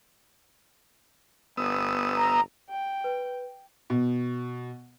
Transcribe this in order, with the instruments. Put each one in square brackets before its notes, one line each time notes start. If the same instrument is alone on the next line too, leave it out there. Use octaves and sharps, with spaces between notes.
[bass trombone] G1 [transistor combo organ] B3 D#6 E6
[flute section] A#5
[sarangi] G5
[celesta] B4
[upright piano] B2